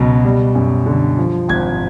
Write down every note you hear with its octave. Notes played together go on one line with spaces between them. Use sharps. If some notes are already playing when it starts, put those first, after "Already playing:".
Already playing: C#2 B2 F#3
G3
F#2
D3
F3
G#1 G#6